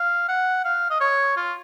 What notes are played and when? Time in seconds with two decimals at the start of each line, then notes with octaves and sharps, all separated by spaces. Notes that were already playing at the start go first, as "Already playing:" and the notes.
Already playing: F5
0.29 F#5
0.65 F5
0.91 D#5
1.01 C#5
1.37 F4